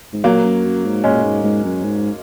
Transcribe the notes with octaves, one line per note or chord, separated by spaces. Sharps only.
G#2
A#2 F#3 A#3
F#2
F#2
G#2
A#2 G#3 C#4
G#2
G#2
F#2
G#2